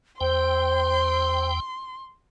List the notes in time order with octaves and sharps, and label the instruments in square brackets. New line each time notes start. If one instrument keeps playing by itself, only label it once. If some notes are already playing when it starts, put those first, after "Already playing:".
[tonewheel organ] E2 G5 [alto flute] C5 [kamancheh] C6